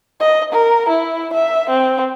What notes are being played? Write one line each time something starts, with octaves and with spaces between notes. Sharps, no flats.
D#5
A#4
E4
E5
C4